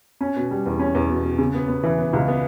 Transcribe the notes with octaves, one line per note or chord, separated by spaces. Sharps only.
C#4
B2
G3
E2
C#4
E2
B2
B2
C#3
B3
B3
E3
B3
C#2
B3